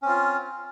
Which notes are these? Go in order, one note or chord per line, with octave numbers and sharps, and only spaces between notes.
C4 C#4 F4